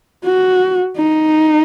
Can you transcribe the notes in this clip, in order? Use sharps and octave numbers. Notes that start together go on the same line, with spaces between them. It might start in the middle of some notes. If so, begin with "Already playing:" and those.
F#4
D#4